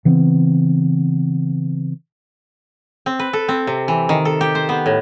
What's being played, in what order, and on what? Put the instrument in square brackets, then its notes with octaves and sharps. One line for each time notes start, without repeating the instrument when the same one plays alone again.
[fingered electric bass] C#3 E3 B3 C4
[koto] C4
B4
A4
C4
C3
E3
D#3
A4
G4
C5
B3
A2